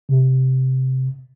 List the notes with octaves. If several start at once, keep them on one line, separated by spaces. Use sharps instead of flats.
C3